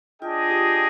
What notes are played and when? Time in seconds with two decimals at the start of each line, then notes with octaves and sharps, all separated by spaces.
0.22 D4 F4 G#4 D#5 G5
0.50 G4